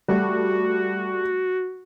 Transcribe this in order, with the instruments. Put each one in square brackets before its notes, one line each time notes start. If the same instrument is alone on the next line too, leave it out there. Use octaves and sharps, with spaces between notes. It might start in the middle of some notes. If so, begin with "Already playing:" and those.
[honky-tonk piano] G3 A3 [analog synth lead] F#4